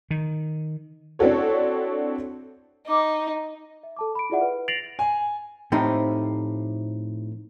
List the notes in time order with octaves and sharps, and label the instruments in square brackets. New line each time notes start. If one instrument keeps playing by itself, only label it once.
[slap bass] D#3
[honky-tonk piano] C4 D4 E4 F#4 A4 C#5
[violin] D#4 [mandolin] D6 F6
[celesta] E5
A4 A5 D6
B5 D7
E4 F4 G#4 D5 E5 F#5
B4
A6 A#6 C7 D7 F7 F#7
[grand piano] G#5
[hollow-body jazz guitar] A2 F3 A3 C4 D#4 G4